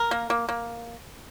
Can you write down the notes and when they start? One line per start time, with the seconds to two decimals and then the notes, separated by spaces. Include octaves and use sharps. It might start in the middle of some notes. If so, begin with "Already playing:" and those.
Already playing: A#4
0.11 A#3
0.30 A#3
0.49 A#3